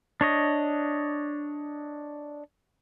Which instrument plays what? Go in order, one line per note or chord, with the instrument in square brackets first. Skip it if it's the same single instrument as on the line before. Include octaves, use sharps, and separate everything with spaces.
[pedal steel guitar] D4 C#5 D#5